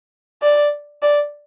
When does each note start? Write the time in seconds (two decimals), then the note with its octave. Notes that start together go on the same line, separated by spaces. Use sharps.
0.42 D5
1.02 D5